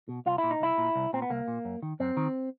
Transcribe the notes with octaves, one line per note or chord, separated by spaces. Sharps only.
B2
C2 F4
E4
A#2
D#4
C2 E4
A#2
C2
A#2 C4
B3
C2 A#3
A#2
F#2
D#3
F#2 C4
D#3